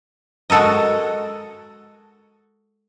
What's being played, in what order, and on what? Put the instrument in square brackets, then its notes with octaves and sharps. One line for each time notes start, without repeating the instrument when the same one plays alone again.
[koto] G#3 F#4 A4 A#4 D#5